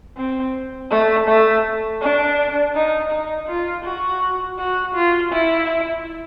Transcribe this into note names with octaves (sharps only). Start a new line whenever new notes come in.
C4
A3
A3
D4
D#4
D#4
F4
F#4
F#4
F4
E4